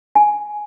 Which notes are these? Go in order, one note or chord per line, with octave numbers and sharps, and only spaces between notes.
G#5